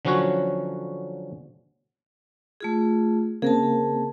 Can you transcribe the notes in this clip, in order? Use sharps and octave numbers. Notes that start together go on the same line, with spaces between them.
D3 F3 F#3 C#4 F#4 C#5
A3 F4 G#4
C#3 A#3 C4 G#4 A#4 A5